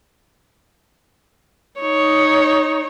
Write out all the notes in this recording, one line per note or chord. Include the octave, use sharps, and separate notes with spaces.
D#4 C#5